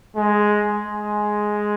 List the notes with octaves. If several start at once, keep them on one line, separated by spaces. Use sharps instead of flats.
G#3
G#3